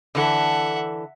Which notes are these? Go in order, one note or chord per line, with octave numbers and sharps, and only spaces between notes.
D3 E3 A4 E5 F#5